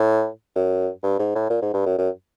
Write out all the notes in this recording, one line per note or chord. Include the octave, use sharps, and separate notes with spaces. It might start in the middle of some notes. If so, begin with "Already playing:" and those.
Already playing: A2
F#2
G2
G#2
A2
A#2
G#2
G2
F#2
F#2